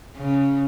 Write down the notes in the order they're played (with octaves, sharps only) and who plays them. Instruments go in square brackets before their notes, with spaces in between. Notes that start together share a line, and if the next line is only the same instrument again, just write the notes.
[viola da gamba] C#3